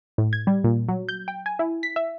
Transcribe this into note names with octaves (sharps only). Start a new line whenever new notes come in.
A2
G#6
G3
A#2
F#3
G6
G5
G#5
E4
B6
E5